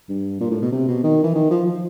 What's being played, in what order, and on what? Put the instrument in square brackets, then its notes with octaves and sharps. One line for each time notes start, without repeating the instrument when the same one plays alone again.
[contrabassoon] G2
A#2
A2
B2
C3
B2
D#3
E3
D#3
F3
F3